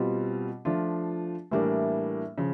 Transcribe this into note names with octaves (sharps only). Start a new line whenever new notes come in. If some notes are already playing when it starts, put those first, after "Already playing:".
Already playing: B2 G3 C4 F4
F3 A3 D4 F4
A2 E3 G3 A#3 D4
C#3 F3